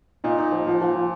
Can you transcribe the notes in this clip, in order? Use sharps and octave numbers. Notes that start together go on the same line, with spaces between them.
A#2 D#4
D#4
F3
F3
F3
F3